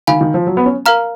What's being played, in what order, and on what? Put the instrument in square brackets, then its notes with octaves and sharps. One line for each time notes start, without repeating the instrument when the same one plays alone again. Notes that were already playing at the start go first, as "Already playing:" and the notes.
[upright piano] D#3 [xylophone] F5 G#5 B5
[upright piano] D#3
F3
F#3
B3
C#4
[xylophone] A#4 F5 A#5 F6